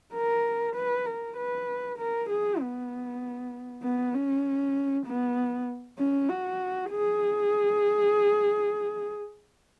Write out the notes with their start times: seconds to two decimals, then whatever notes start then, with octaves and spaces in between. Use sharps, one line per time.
0.14 A#4
0.75 B4
1.06 A#4
1.37 B4
1.98 A#4
2.29 G#4
2.60 B3
3.83 B3
4.14 C#4
5.06 B3
5.98 C#4
6.29 F#4
6.91 G#4